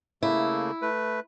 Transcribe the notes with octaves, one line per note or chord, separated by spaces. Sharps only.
C#3 A3 A#3 E4
A3 B4